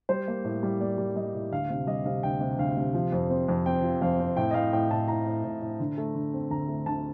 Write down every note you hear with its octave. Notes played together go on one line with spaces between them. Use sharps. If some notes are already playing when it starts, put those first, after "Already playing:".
G3 C5
A#3
A2
G3
A#3 D5
G3
G3 D#5
A2
D2 F5
C3
G3 D#5
C3 F5
D2 G5
C3
D2 F5
C3
F3
F2
C4
F2
C4 G5
F3
F2 F5
C4
A2 G5
D#5
A2 F5
A2 G5
A2 A5
A2 A#5
A2
A2
A2
D3
A3
D3
C4
D2 A#5
A3
D2 A5